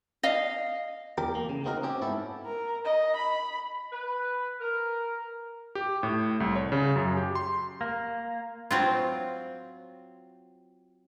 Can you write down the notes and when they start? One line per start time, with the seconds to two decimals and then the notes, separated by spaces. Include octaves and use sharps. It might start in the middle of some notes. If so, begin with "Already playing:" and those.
0.23 D#5 F5
1.18 E2 G4 A#4
1.35 A#3
1.49 C#3
1.65 A#3 C4 D#4 F#4 A#4
1.83 C4 C#4 G4
2.01 G#2 B3 E4 A4
2.45 A#4
2.84 D#5
3.17 B5
3.93 B4
4.60 A#4
5.75 G4
6.03 A2
6.40 C2
6.56 C#5
6.72 C#3
6.96 F#2
7.17 G4
7.35 C6
7.81 A#3
8.71 F#3 C4 F4